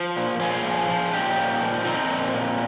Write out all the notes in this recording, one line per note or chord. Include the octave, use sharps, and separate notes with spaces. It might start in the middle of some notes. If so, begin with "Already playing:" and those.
Already playing: F3
A#2
A#2 F4 G#4
F3
F3
A#2 D#4 G4
A#2
F3
F3 C4 D#4
A#2
A#2